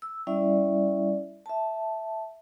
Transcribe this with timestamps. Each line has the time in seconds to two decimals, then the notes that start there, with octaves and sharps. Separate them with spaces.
0.02 E6
0.27 G3 C#4 E4 D5 E5
1.46 E5 A5